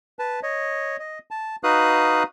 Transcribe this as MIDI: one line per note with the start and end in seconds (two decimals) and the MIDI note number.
0.19 0.40 71
0.19 0.40 81
0.43 0.97 73
0.43 0.97 75
0.99 1.19 75
1.31 1.56 81
1.64 2.23 63
1.64 2.23 66
1.64 2.23 71
1.64 2.23 77
1.64 2.23 87
1.64 2.23 90